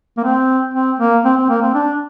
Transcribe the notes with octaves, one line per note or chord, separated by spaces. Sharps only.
A#3
C4
C4
A#3
C4
C4
A#3
C4
D4